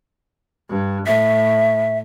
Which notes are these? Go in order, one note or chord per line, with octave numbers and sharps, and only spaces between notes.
G2
A2 E5